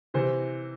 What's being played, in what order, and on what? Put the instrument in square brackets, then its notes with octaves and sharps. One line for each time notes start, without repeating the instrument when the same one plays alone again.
[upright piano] C3 E3 C5